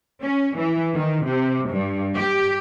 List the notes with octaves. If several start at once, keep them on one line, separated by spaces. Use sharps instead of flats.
C#4
E3
D#3
C3
G2
G4